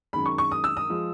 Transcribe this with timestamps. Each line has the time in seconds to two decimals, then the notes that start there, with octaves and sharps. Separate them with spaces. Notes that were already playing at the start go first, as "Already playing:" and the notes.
0.13 F#2 D#3 G#3 B5
0.26 C#6
0.38 C#6
0.51 D#6
0.64 E6
0.77 D#6
0.89 F3 G#3